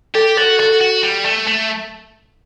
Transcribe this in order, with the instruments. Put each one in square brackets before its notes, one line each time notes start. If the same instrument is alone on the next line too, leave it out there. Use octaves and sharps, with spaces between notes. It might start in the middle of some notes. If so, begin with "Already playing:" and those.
[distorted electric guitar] G4 [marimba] A4
[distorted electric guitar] F#4 [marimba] A4
[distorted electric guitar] F#4 [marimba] A4
[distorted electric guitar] F#4
G3
A3
A3